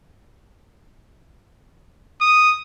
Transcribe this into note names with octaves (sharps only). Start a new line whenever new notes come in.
D#6